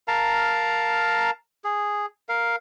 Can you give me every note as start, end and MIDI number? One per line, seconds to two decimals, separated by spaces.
0.08 1.31 70
0.08 1.31 77
0.08 1.31 81
0.08 1.31 82
1.64 2.06 68
2.29 2.56 70
2.29 2.56 77